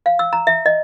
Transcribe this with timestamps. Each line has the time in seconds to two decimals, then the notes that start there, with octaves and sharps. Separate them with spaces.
0.06 F5
0.19 E6
0.33 A#5
0.47 E5
0.66 D#5